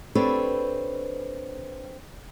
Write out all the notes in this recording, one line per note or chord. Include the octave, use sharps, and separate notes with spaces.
C4 D4 G4 A4 B4 C#5